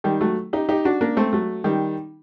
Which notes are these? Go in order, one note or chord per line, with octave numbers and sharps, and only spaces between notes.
D#3 G3
F#3 A3
D#4 G4
D#4 G4
D4 F#4
A#3 D4
A3 C4
F#3 A3
D#3 G3